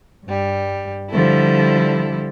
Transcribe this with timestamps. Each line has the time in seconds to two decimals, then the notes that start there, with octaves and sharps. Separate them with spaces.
0.24 G2 G3
1.10 D3 F3 G3 E4 A4